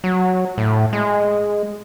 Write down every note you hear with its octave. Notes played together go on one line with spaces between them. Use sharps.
F#3
A2
G#3